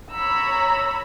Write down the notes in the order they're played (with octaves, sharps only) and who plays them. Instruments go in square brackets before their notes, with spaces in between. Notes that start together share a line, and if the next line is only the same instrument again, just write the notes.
[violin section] C#5 A#5 B5 [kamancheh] E6